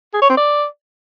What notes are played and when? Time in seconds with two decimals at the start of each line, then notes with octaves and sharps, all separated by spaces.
0.14 G#4
0.22 C#5
0.29 C4
0.37 D5